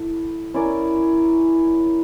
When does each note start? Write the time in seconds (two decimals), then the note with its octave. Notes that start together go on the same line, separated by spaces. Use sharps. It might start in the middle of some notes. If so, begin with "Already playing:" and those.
Already playing: E4 A4
0.54 C#4 E4 A#4 D5